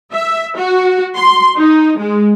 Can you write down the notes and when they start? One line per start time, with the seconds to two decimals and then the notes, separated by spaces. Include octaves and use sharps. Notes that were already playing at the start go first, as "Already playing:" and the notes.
0.14 E5
0.58 F#4
1.16 C6
1.57 D#4
1.98 G#3